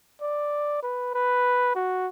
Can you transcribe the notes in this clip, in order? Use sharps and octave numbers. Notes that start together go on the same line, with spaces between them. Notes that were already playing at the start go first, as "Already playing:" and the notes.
D5
B4
B4
F#4